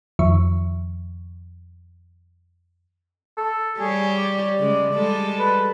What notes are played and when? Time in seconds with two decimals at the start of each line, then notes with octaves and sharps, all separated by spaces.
0.19 F2 D#3 F3 E5 C#6
3.37 A4
3.79 G3 G4 G#4 C#5
4.17 D5
4.60 C#3 G#3
4.93 G3 G#3 A4
5.39 B4